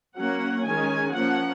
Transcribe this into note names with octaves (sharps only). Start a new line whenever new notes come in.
F#3 A#3 C#4 F#5
D#3 G#3 C#4 G#5
F3 A#3 C#4 F#5